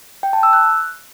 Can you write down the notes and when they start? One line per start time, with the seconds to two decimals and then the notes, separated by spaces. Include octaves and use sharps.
0.23 G5
0.33 A5
0.43 E6
0.53 F#6